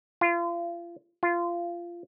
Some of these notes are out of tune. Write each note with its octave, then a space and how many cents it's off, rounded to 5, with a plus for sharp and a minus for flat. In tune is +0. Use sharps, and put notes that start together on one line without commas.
F4 -30
F4 -15